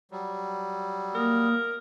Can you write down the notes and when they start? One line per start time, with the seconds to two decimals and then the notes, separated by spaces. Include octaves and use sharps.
0.11 F#3 G3
1.15 A#3 A#4 D#6